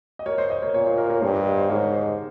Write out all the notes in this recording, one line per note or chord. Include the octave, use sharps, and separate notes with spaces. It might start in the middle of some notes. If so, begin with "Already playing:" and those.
D#5
A#4 C#5
C5 D#5
C5 D#5
A#4 C#5
A#2 A#4 C#5
C5 D#5
A#4 C#5
A#4 C#5
G2 G#4 C5
G4 A#4
C5 D#5
C5 D#5
G#2 A#4 C#5
C5 D#5